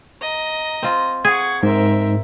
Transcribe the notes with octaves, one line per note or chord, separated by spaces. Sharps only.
D#5 A#5
C4 F4
G#4 F#5 C#6 G#6
G#2 C4 A#4 E5